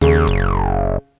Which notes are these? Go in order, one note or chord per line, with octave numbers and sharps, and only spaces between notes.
D#2 C#3
F#1